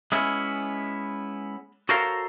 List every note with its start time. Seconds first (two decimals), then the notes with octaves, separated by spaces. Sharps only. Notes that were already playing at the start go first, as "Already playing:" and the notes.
0.12 G#3 B3 C#4 E4
1.89 F#4 A4 A#4 C5 C#5 F5